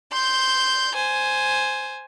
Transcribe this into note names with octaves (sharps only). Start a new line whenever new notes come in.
C6 G6
C5 G#5